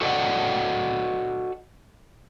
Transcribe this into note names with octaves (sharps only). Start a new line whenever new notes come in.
F#4 A4 D5 D#5 F#5